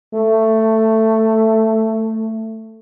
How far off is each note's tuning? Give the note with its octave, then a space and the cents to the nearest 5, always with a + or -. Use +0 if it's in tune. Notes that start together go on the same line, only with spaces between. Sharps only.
A3 +10